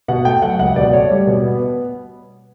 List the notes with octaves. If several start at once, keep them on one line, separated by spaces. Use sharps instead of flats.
B2 F#5
A3 G5
F#3 F#5
C#2 F#5
B2 D5
A3 C#5
G3
B2
B3